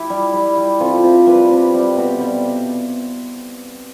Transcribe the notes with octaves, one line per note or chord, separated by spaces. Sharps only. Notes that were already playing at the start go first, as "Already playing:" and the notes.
Already playing: E4 G4
G3
G3
G3
C3 F4 A4
C3
G3 G4 B4
C3
G3
B2
G3